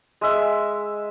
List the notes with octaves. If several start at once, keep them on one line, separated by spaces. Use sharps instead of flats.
G#3 E5